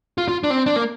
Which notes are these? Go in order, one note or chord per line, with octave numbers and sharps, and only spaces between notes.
F4
F4
D4
C4
D4
A#3